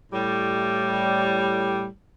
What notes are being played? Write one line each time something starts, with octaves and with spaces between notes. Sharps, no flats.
A2 G3